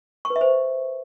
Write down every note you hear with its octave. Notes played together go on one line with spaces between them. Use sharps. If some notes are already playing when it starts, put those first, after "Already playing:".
C#6
B4
E5
C5